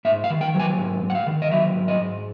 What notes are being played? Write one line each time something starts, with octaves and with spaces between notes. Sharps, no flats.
G#2 E5
F5
D#3
G5
F#3
G#5
G#2
G#2
F#5
F5
D#3
D#5
F#3 E5
G#2
D#5
G#2